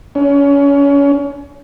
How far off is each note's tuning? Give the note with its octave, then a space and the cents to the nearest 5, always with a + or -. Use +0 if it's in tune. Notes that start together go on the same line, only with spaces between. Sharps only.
C#4 +30